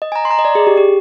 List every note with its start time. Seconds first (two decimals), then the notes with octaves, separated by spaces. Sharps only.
0.02 D#5
0.12 G#5
0.15 A#5
0.25 C6
0.31 A#5
0.39 D#5
0.45 D5
0.55 G#4
0.67 G4
0.77 G4